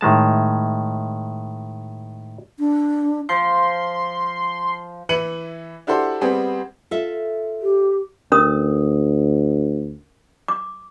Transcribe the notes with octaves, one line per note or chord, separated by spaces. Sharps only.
A2 D#3 G#3 A5
D4
F3 C6
E3 E4 B4 C#7 D#7 F#7
D4 E4 F#4 G4 A4 C5
G3 B3 C4 G#4
F4 A4 E5
G4
D2 C#4 A#4 D#6
D6